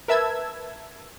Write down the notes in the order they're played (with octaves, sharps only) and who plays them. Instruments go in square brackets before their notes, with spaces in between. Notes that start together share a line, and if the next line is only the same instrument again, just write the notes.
[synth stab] A#4 B4 E5 A5 E6 G#6